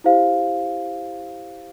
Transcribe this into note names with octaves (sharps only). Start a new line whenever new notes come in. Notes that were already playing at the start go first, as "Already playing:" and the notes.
E4 G4 C5 F5